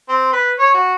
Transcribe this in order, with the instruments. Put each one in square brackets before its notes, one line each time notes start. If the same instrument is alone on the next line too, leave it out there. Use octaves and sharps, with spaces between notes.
[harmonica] C4
B4
C#5
F#4